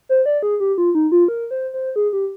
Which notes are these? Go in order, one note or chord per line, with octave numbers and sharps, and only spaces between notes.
C5
D5
G#4
G4
F4
D#4
F4
A#4
C5
C5
G#4
G4